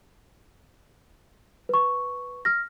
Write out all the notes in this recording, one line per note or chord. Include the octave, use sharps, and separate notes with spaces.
B4 C#6
F6 A#6